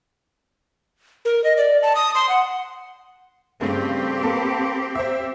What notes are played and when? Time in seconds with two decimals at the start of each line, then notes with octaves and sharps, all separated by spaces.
1.25 A#4
1.44 D#5
1.57 D5
1.82 A5
1.95 D#6
2.15 C6
2.29 F#5
3.61 G2 C#3 A3 C4 G4
4.23 A#3 A4 B4
4.95 C5 E5